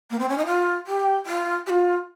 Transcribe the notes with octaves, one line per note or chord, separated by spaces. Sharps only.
A#3
C4
C#4
D#4
F4
G4
F4
G4
F4